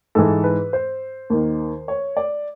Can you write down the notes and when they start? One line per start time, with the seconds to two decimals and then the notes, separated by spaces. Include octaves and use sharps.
0.15 G#2 E3 A4
0.44 B4
0.73 C5
1.30 D#2 D#3
1.88 C#5
2.17 D5